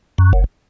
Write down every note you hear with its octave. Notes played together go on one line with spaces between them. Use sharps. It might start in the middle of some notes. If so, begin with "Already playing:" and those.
F#2
F#1